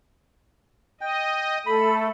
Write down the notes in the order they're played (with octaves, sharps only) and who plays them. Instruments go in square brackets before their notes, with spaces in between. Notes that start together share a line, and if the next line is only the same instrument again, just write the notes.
[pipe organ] D#5 [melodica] G5
[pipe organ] A3 [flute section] A4 [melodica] B5